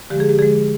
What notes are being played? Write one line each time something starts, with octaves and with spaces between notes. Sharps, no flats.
D3 F3 G#3 G4
G#4
G4
D3 F3 G#3 G#4